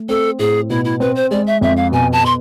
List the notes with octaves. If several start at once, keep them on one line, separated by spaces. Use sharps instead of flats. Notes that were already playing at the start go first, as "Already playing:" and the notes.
Already playing: A3
C4 A4
A2 G#4
B2 E4
E4
C4 B4
C5
G#3 D5
E5
F2 E5
F5
B2 G#5
A5
B2 C6